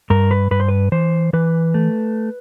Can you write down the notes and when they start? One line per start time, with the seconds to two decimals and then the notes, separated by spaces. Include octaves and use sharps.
0.10 G2 A#4
0.31 B4
0.51 G2 B4
0.60 C5
0.69 B4
0.92 E3 C5
1.33 E3 B4
1.74 A3